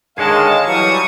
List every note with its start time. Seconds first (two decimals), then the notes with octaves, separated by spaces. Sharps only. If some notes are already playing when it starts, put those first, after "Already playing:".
0.18 D3 D#3 G#3 G#4 C#5 D#5 F5 A5
0.67 E3 F#3 G3 C#6 D#6